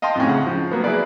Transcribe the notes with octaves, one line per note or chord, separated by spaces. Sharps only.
D#5 F5 G5 A5 C6
F2 A2 C#4
C#3 F#5
F3
F#3 A#3 B3
E4 G#4 B4 D5